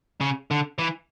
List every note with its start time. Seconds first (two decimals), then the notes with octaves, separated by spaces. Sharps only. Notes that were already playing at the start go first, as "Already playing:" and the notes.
0.21 C#3
0.51 D3
0.79 E3